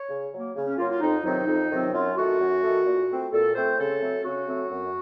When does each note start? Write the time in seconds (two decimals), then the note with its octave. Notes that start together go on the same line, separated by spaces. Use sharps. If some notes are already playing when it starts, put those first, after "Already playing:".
Already playing: C#5
0.09 C#3
0.32 F#3 A#3
0.55 C#3
0.66 C#4
0.77 F#3 A#3 F4
0.90 F4
1.00 F2 D#4
1.24 C3 D#3 F#3 C4 D#4
1.46 F2
1.69 C3 D#3 F#3 C4
1.92 F#2 F4
2.16 D#3 A3 F#4
2.39 F#2
2.62 D#3 A3
2.85 A#2
3.08 A3 C4
3.31 A#2 A4
3.55 A3 C4 C5
3.77 C#3 A4
4.00 F#3 A3 C4
4.24 C#3 F#4
4.47 F#3 A3 C4
4.71 F#2